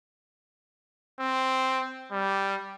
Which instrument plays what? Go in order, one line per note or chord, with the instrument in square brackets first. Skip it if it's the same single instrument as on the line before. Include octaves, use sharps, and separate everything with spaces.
[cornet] C4
G3